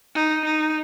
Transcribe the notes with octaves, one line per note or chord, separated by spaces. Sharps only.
D#4
D#4